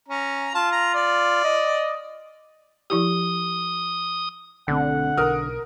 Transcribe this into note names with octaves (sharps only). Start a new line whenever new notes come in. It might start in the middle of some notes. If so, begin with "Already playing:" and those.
C#4 A#5
F4 A5
A#5
D5
D#5
F3 E4 G4 D#6
B1 D3 A3 C4 F#5
B1 A#4 D#6 F6